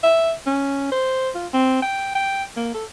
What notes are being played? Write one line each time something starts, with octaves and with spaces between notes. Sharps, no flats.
E5
C#4
C5
F4
C4
G5
G5
A#3
A4